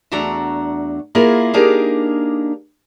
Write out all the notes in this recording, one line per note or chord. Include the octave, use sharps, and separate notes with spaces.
E2 A3 D4 F#4 F#5 A#5
A#3 E4 F4 G#4 A#4
A#3 D4 D#4 G4 G#4 A#4